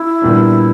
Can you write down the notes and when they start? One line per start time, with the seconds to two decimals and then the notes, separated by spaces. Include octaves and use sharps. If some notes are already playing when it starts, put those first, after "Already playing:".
Already playing: E4
0.22 A#2 G3 B3 D4